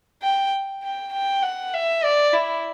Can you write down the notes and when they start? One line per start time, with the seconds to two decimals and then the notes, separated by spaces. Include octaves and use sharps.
0.22 G5
0.83 G5
1.13 G5
1.43 F#5
1.73 E5
2.04 D5
2.34 E4